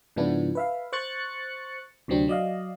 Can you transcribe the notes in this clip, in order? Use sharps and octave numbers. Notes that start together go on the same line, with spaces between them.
G#2 C#3 F3 B3 D4 E4
B4 E5 F5
C5 C#6 F#6 A6 C#7
D2 C3 F#3 C4 D4
F#3 D5 D#5 F5